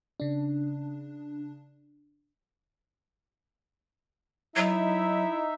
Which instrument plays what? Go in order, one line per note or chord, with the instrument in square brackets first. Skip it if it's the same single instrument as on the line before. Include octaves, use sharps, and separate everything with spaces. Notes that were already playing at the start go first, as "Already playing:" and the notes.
[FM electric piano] C#3 D4
[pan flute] F#3 [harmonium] D#4 E5 [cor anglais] E4